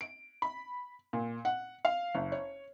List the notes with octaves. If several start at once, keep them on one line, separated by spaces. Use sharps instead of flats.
D7
B5
A#2
F#5
F5
F#1
C#5